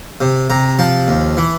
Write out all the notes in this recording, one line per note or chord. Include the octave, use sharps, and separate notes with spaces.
C3
C3 A#5
F3 A5
D#2
E3